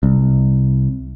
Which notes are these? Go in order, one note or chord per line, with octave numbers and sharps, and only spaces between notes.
C2